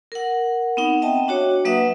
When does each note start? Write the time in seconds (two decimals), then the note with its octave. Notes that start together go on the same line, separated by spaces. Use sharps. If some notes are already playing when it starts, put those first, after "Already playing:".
0.12 A#4 F#5
0.77 B3 C4 D#4 F#5
1.02 D#5 E5 G5 A5
1.28 D4 F#4 C#5
1.65 F#3 A#3 B4 E5 F#5 D#6